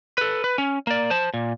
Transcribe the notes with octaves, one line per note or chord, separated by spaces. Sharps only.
A4 B4
B4
C#4
A#3 D5
C5 A5
A#2